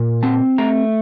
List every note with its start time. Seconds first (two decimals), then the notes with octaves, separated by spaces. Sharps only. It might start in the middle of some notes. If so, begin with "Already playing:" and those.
Already playing: A#2
0.23 C4 A5
0.58 A3 A#5